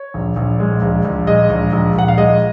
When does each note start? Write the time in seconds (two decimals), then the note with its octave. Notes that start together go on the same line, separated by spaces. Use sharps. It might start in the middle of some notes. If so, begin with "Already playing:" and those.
Already playing: C#5
0.14 A#1
0.36 A#1
0.60 G#3
0.82 A#1
1.05 A#1
1.27 G#3 D#5
1.50 A#1
1.73 A#1
1.95 A#1 F#5
2.08 F5
2.18 G#3 D#5